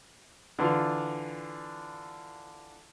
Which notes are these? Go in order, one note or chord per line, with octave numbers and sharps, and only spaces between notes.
D3 E3 D4 F4